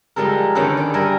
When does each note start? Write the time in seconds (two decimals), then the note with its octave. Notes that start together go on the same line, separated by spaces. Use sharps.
0.16 F3 G3 G#3 A4 A#4
0.55 D3 D#3 C#4 D4 A4 B4
0.77 D5
0.94 G3 A#4 E5 G#5